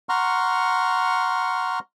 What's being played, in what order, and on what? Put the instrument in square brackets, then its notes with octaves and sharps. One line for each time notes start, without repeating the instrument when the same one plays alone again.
[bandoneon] F#5 A#5 C6 C#6 F6